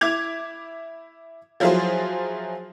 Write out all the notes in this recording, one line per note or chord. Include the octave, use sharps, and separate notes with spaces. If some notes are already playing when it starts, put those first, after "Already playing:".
E4 D6 G#6 F7
F3 F#3 E4 F4 G#4 C5